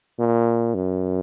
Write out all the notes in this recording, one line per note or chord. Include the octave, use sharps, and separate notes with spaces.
A#2
F#2